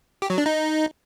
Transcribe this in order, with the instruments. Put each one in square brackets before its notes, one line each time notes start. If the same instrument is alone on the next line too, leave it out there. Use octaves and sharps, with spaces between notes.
[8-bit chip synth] G4
F#3
D4
D#4